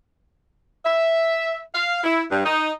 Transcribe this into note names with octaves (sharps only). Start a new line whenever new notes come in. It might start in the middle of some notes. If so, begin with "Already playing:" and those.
E5
F5
E4
G2
D#4